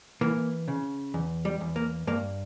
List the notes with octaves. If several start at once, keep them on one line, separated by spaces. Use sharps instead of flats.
E3 A#3
C#3
E2
G3
E2
A#3
G2 A#3